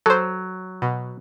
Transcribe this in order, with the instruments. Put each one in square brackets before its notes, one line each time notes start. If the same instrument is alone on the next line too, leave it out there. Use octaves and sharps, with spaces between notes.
[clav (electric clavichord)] F#3 [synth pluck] A4 C5
[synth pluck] B2